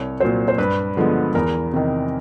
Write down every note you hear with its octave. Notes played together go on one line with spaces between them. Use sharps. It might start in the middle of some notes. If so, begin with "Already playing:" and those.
Already playing: C2 C#5
A#2 F#3 C5
C5
G2 B4
D3 F3 G#3 B3
E2 A#4
C3 D#3